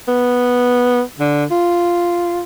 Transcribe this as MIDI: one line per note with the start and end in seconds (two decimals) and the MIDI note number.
0.08 1.02 59
1.19 1.45 50
1.51 2.42 65